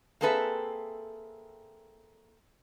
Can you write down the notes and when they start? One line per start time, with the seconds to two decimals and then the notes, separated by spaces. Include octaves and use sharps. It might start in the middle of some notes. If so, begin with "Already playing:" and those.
0.21 A#3 C4 G#4 A4 B4 E5